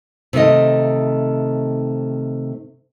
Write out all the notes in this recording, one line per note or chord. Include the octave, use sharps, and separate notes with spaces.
C3 D#3 A3 D#5